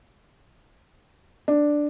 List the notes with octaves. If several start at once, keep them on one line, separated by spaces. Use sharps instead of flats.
D4